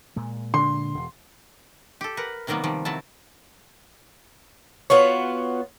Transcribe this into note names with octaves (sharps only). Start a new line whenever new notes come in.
A#2 G#3
D3 C6
E1
G4 A4
A#4 B4 F#5
C3 D#3 F#3 G3 A#3 B3
D#3 F3 G3
C3 F#3 E4 A5
B3 F4 F#4 C#5